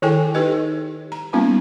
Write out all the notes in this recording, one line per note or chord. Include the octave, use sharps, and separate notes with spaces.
D#3 E4 G#4 A4 G5 G#5
D#4 G4 A4 B4 D#5
A#5
G3 A#3 B3 C#4 D#4 F4